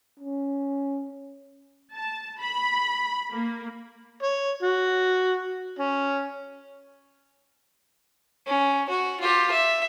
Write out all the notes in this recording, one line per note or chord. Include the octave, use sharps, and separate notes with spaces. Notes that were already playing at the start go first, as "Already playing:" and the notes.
C#4
A5
B5
A#3
C#5
F#4
C#4
C#4
F#4
F4 G4
E5